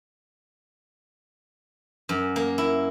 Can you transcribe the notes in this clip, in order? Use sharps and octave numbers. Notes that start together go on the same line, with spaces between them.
F#2
A#3
E4